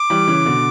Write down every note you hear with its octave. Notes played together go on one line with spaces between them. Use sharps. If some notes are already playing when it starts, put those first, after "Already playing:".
Already playing: D6
E3 G3
C#3 E3
B2 D3